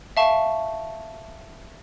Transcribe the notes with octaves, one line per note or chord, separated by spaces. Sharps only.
E5 F5 A5 C#6